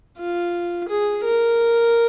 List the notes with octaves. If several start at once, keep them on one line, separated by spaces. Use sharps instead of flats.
F4
G#4
A#4